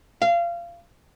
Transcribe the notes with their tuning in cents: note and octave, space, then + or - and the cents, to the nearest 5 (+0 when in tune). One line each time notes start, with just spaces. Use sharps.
F5 -25